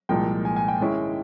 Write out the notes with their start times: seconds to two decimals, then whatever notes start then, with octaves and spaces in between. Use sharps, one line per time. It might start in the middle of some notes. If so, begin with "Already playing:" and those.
0.09 C2 A#2 F3 G#3 G5
0.45 G#5
0.56 G#5
0.68 G5
0.80 G#2 D#3 G#3 C#4 E4